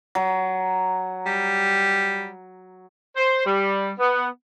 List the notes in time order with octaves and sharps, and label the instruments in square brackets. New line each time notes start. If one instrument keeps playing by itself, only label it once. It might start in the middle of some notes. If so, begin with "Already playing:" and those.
[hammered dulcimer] F#3
[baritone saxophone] G3
[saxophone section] C5
G3
B3